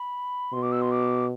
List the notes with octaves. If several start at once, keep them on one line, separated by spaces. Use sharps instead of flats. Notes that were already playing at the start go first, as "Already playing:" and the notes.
Already playing: B5
B2 C6
D6
E6
C6
D6